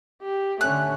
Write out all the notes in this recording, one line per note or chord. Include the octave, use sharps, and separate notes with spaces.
G4
D3 A3 C#4 F#6